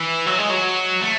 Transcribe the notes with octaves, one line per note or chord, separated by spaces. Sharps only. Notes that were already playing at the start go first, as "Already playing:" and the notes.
Already playing: E3
F#3
G#3
F#3
A3